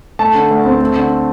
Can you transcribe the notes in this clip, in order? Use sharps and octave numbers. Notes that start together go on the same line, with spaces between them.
A3 A5
D3
D2
C4
A3
D3